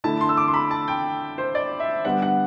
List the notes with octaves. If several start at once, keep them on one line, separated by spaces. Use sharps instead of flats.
D3 A3 E4 A5
C6
E6
D6
C6
B5
A5
G5
C5
D5
E5
D3 G3 B3 D4 F#5
F#5